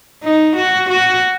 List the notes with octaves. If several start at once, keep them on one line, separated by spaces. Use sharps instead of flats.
D#4
F#4
F#4